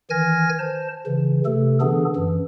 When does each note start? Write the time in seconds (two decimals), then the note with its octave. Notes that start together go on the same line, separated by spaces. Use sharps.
0.10 D#3 E3 G#5 F6 G#6 A#6
0.59 C5 A5
1.06 C#3 E3
1.46 C3 A3 A4
1.81 D3 E3 B3 D4 G#4 A4
2.16 F#2 E3